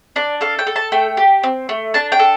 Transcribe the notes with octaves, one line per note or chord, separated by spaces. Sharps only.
D4 D5
A4 F5
G5
A4
A5
A3 G5
G4
C4
A3
D4 A5
G5
A4